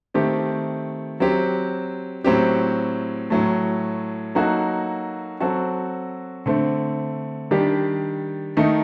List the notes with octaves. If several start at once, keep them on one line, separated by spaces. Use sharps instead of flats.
D#3 A3 C4 G4
F#3 C4 G4
A2 F#3 C4 G4
A2 F#3 A3
F#3 A#3 D#4 F#4 A4
F#3 C4 F#4 A4
D3 A3 C4
D#3 G3 D4 G4
D#3 A3 D#4